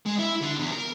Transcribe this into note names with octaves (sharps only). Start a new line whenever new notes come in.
G#3
E4
D3
E2
A#4